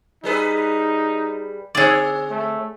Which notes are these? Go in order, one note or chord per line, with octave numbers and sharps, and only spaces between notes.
G3 D#4 G#4 B4
D3 C4 G#4 C#5 D5
A3